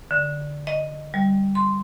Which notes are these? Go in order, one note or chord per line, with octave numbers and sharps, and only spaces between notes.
D3
D#5
G3
C6